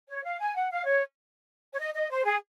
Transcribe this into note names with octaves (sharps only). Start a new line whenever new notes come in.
C#5
F5
G#5
F#5
F5
C#5
C#5
D#5
D#5
C5
G#4